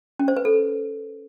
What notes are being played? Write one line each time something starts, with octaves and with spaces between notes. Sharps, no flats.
C#4
C5
B4
A4